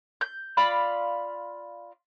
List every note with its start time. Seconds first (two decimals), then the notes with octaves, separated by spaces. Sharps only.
0.21 G6
0.57 F4 D5 F5 B5